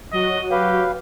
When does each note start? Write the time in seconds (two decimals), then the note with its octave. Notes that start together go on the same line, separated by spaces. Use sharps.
0.13 F#3 F#4 D#5
0.51 G4 B4 F5